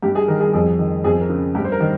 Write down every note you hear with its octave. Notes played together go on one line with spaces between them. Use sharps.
G2 G4
G#4
D#3 A#4
G#4
F2 G#4
D#3
F2 G#4
A#4
C#3
G2 G4
C5
A#4
D#3